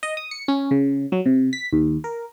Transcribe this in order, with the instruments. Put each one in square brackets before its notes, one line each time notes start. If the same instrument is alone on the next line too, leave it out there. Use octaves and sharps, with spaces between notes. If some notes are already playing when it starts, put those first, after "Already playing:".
[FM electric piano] D#5
D#6
C#7
C#4
C#3
F#3
C3
B6
D#2
A#4